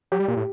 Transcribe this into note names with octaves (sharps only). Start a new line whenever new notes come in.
F#3 G4
G3
A#2
A2